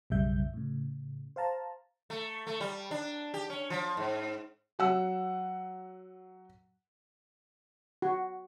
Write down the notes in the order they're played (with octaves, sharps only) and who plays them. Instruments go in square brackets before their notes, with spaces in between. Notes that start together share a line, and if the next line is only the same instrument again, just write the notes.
[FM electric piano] B1 F#2 C#3 G3 E5 G6
A2 C#3
C5 F5 A5 A#5
[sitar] A3
A3
G3
D4
G4
C#4
F3
G#2
[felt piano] F#3 F#5 E6
[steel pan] F#4